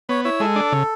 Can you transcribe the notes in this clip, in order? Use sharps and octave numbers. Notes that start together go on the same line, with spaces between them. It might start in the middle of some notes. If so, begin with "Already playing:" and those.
B3 C#5
E4 C#5
G#3 A4
D4
C#3